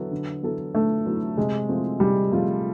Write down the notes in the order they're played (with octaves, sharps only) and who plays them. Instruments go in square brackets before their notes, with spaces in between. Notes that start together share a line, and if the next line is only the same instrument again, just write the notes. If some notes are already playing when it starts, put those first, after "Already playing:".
Already playing: [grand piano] D3 F#3 B3 E4 A4
D3
F#3 B3 E4 A4
[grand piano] D3 [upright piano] A3
[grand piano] F#3 B3 E4 A4
[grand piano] C3 [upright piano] G#3
[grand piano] F3 A3 C4 F4
[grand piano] C3 [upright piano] G3
[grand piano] F3 A3 C4 F4